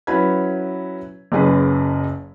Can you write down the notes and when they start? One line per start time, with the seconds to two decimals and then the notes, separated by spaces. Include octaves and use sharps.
0.07 F#3 C#4 E4 B4 B5 G#6
1.32 F#1 F#2 G#4 B4